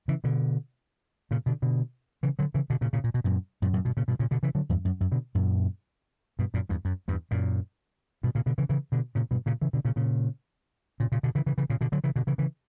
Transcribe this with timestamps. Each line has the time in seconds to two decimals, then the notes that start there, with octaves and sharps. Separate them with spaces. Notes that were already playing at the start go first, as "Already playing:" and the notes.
0.08 C#3 E3
0.24 B2 D3
1.31 A#2 C#3
1.46 B2 D3
1.62 B2 D3
2.23 C#3 E3
2.39 D3 F#3
2.54 C#3 E3
2.70 B2 D3
2.81 A#2 C#3
2.93 A#2 C#3
3.04 A#2
3.14 B2
3.24 F#2 A#2
3.62 F#2 A#2
3.73 F#2 A#2
3.85 G2 B2
3.97 A#2 C#3
4.08 G2 B2
4.19 A#2 C#3
4.31 B2 D3
4.43 C#3 E3
4.55 D3 F#3
4.69 E2 G2
4.85 F#2
5.00 F#2
5.12 B2 D3
5.35 F#2 A#2
6.39 G2 B2
6.54 F#2 A#2
6.69 E2 G2
6.85 F#2
7.08 E2 G2
7.31 F#2 A#2
8.23 G2 B2
8.35 A#2 C#3
8.46 B2 D3
8.58 C#3 E3
8.69 C#3 E3
8.92 B2 D3
9.15 A#2 C#3
9.31 G2 B2
9.46 A#2 C#3
9.61 C#3 E3
9.73 B2 D3
9.85 A#2 C#3
9.96 A#2 C#3
11.00 A#2 C#3
11.12 A#2 C#3
11.23 B2 D3
11.35 C#3 E3
11.46 C#3 E3
11.58 C#3 E3
11.70 A#2 C#3
11.81 B2 D3
11.92 D3 F#3
12.04 C#3 E3
12.16 B2 D3
12.27 C#3 E3
12.38 C#3 E3